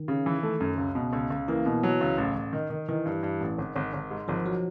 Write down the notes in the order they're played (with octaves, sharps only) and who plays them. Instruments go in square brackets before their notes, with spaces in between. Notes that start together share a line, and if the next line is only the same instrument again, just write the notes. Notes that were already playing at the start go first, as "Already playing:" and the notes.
Already playing: [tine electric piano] D#3
[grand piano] C#3
E3
A3
F#2
C#2
B2
C#2
C#2
[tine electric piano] E3 [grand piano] A#3
[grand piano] B2
F#3
C#2
A1
A1
D#3
D#3
[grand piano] D#3 [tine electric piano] E3
[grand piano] G2
G2
A1
G#1
G#1
G#1
G#2
[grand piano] G#1 [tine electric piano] F3
[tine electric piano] F#3